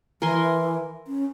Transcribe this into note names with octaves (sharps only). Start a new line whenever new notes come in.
E3 A#4 G#5 C6
C#4